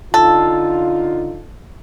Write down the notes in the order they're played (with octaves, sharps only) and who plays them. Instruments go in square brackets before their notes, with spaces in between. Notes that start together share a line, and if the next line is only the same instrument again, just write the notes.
[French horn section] D3 D#4 F4 [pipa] A4